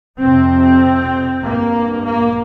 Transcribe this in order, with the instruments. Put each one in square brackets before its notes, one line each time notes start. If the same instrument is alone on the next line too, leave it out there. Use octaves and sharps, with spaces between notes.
[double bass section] F2 C3 C4
G2 A#3
A#3